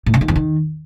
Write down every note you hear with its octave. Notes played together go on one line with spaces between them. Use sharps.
A2
C#3
D#3
E2
D#3